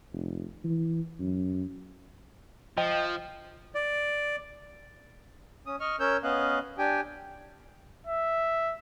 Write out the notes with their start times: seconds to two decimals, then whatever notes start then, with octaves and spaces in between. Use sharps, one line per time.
0.13 F1
0.64 E3
1.20 F#2
2.78 F3 D#5 G5
3.75 D5
5.66 C#4 D#6
5.80 D#5 C#6 F6
6.00 C#4 A#4 C#5 E6 G6
6.23 B3 C#4 D#5 F5 F#6
6.78 D4 G4 G5 G#5
8.07 E5